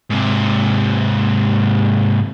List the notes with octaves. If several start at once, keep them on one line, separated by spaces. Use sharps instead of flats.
G#2 C3